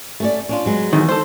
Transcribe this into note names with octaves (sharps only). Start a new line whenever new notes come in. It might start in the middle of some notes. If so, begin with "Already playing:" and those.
A3 C#4 D5
C#4 D4 F4
F#3 G#3 B3
E2 G#2 D#3
A4 C5